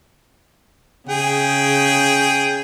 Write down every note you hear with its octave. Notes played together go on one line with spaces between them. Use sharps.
C#3 G#4 G5